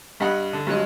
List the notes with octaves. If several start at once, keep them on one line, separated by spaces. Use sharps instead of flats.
G2 D#5 F#5 B5
D3
G2 F#3 G#3